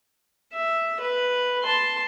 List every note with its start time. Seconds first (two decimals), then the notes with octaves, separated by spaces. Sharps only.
0.53 E5
1.00 B4
1.63 A5 C6